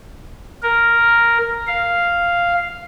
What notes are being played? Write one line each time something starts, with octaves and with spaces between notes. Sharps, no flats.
A#4
F5